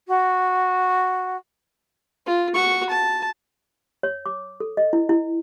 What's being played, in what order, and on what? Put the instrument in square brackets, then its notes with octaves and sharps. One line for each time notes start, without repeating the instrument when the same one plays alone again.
[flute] F#4
[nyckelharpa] F4
F#4 C#6
A5
[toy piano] C#5
D6
A4
D#5
E4
E4